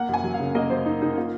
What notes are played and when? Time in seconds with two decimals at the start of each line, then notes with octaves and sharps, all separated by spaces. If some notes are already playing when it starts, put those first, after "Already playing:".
Already playing: A#3 F#5
0.09 F#2 G#5
0.24 F#3
0.34 F5
0.40 C#3
0.55 A#3 D#5
0.70 F#2 C5
0.86 F#3 D#4
1.01 C#3 D#4
1.17 A#3 F4